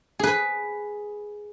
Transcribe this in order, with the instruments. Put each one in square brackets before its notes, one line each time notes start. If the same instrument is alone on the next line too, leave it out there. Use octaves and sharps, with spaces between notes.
[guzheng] G#4 B4